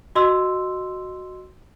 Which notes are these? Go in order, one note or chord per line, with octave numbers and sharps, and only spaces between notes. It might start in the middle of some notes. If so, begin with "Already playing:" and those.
F#4 D#5 C6 E6